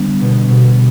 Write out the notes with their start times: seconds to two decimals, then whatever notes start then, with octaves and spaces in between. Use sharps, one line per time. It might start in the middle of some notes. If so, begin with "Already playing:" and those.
Already playing: D3 G3 B3 D4
0.21 B2
0.48 B2